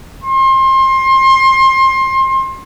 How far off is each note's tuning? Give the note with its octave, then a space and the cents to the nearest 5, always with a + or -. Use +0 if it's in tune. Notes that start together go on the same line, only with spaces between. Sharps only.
C6 +25